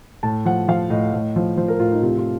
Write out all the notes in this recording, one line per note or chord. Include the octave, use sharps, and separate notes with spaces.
A2 A5
F3 F#5
F3 F5
A2 D#5
A2
F3
F3 C5
A#4
A2 F4
D#4
C3 F4
F4